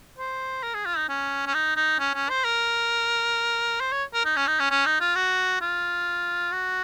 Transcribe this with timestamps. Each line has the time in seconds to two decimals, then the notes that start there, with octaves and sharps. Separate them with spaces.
0.18 C5
0.63 A#4
0.74 G#4
0.86 F4
0.98 D#4
1.09 C#4
1.46 C#4
1.54 D#4
1.76 D#4
1.99 C#4
2.15 C#4
2.30 C5
2.45 A#4
3.80 C5
3.92 C#5
4.14 A#4
4.25 D#4
4.36 C#4
4.47 D#4
4.60 C#4
4.71 C#4
4.86 D#4
5.00 F4
5.15 F#4
5.61 F4
6.52 F#4